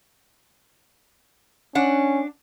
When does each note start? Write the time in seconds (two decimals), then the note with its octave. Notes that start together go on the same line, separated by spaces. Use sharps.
1.75 C#4 D4 F#5